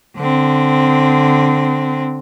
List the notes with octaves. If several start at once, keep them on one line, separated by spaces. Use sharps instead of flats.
D3 C4